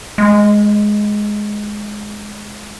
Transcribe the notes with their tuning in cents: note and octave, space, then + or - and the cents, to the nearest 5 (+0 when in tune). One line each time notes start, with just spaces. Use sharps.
G#3 +5